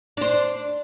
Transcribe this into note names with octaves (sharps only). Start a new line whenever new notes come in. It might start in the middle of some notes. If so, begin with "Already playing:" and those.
D4 C5